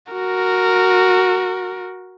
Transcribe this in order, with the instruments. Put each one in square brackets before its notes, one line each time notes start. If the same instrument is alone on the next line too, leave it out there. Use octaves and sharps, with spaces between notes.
[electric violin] F#4 A#4